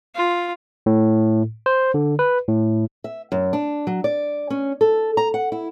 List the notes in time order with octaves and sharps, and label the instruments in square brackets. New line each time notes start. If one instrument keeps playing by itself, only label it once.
[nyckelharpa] F4
[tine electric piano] A2
C5
D3
B4
A2
[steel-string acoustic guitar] E5
F#2
D4
F#3
D5
C#4
A4
A#5
F#5
E4